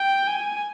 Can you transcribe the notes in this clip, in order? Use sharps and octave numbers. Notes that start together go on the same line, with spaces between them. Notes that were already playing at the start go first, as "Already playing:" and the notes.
Already playing: G5
G#5